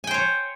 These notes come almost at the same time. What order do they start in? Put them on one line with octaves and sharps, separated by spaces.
G#5 G5 C5 C#5